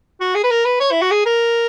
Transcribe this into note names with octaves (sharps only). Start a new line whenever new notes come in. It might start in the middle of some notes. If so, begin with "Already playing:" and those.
F#4
G#4
B4
A#4
B4
C#5
E4
F#4
G#4
A#4